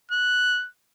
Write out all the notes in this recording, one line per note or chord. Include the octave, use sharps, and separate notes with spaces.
F#6